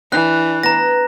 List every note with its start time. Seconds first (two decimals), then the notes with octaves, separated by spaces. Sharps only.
0.12 E3 D4 F#6
0.63 B3 A#5 A#6